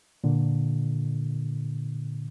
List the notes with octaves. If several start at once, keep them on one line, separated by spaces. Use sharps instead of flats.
A#2 D3